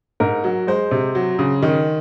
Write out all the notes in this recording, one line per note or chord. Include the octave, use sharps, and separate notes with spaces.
G#2 A#4
F#3
G#3 C5
C3
F#3
C#3
D#3